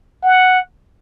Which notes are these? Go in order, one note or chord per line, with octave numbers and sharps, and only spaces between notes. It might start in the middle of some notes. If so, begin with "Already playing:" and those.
F#5